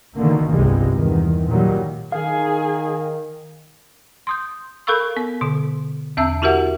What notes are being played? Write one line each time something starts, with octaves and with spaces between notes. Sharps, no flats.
B2 D3 D#3 A#3
G1 C2 C3 G3 G#3
E2 D#3
A#2 D#3 F#3 G3
D#3 G#4 F5 G#5
C6 D#6 G6
A4 A#4 F5 B5 C#6 E6
B3
B2 D3
E2 C4 E5 A5 E6
E4 F#4 G4 A#4 E5 F#5